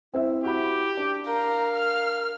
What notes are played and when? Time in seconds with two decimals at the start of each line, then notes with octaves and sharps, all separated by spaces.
0.14 C4 E4 C5 E5
0.44 F#4 G4 B5
0.97 D4
1.27 A#4 F5 A#5
1.76 F6